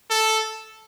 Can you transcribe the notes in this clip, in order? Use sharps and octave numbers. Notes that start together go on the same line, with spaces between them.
A4